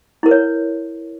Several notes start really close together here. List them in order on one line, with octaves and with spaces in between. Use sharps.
E4 A#4 B4 C#5